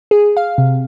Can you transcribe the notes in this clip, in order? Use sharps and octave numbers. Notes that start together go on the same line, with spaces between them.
G#4
F5
C3